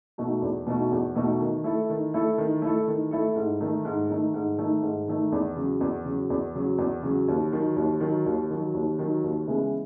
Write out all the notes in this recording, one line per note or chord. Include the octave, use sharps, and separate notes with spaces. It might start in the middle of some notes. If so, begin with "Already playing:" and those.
B2 A3 D#4 F#4
E2
B2 A3 D#4 F#4
E2
B2 A3 D#4 F#4
D#3
A3 E4 A4
D#3
A3 E4 A4
D#3
A3 E4 A4
D#3
A3 E4 A4
G#2
D#3 A3 D#4
G#2
D#3 A3 D#4
G#2
D#3 A3 D#4
G#2
D#3 A3 D#4
E2
C#3 F#3
E2
C#3 F#3
E2
C#3 F#3
E2
C#3 F#3
D#2
D#3 F#3
D#2
D#3 F#3
D#2
D#3 F#3
D#2
D#3 F#3
D#2
C#3 E3 G#3 B3